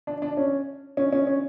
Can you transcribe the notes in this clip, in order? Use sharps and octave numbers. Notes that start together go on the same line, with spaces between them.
D4
D4
C#4
C#4
C#4
C#4